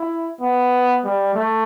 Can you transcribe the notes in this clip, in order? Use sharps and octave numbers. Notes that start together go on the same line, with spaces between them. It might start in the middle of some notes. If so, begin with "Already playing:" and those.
Already playing: E4
B3
G3
A3